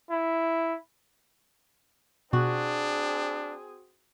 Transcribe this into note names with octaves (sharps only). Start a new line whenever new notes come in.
E4
B2 C4 D4 F#4 G#4